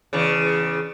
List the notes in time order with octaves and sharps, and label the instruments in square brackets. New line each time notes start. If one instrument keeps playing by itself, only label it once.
[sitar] E2 C#3